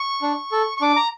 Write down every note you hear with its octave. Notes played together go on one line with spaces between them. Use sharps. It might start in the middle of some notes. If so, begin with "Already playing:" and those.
Already playing: C#6
D4
A4
C#6
D4 D6
A#5